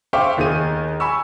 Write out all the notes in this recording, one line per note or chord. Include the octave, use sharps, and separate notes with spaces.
C5 E5 F5 G5 C#6 D6
D#2 D#3 G#4 D#7
G#5 B5 C#6 E6